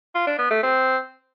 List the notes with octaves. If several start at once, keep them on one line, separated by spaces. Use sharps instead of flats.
F4
D4
B3
A3
C4